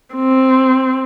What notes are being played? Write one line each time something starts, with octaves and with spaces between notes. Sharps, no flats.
C4